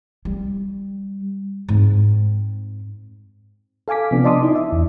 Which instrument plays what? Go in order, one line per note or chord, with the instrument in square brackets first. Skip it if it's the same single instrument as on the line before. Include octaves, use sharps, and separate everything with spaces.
[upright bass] G3
G#2 C4
[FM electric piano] A4 F5 G#5 D6 B6
C3 F3 B3 D4
D5 D#5 A5 C6 D6 D#6
D#4 E4
E5
E2